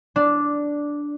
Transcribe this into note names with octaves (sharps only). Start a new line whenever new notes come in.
D4